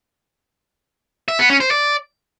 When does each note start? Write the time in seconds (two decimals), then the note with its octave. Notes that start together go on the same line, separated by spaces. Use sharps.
1.28 E5
1.39 B3
1.50 C#4
1.60 C5
1.71 D5